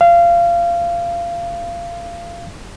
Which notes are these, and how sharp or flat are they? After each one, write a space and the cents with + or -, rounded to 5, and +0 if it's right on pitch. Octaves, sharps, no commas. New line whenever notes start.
F5 -25